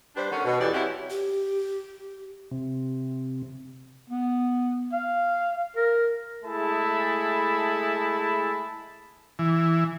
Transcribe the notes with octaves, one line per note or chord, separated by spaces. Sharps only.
G3 D4 G4 B4 C5
D3 D#3 B3 C#4
B2
E2 E3 G4 A4 C#5 D5
F#3 C4 C#4 E4 F#4 G4
G4
C3
B3
F5
A#4
G#3 A3 E4 G#4 A5 B5
E3